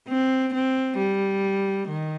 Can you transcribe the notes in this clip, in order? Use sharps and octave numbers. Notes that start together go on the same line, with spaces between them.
C4
C4
G3
D#3